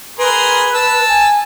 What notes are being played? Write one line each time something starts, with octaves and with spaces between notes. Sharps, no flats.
G#4 A#4 B4 C6
A5 E6
G#5